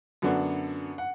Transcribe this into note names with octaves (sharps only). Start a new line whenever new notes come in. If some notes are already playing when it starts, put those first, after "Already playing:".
F#2 D3 F#3 B3 D4
F#5